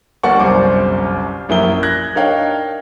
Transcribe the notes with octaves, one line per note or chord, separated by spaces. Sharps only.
G1 A#3 D5 F#5 C#6
G1 C2 F#2 C5 D6
A#1 F#2 E4 A#4 D#6 G7
F#6 G#6 A#6
D4 D#4 A#4 C#5 F5 G5